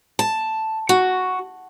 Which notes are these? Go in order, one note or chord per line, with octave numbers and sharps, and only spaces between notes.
A5
F#4